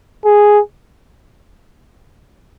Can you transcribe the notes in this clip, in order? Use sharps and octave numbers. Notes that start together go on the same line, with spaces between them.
G#4